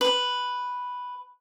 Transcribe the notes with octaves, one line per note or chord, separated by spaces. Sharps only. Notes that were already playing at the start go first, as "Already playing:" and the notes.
B4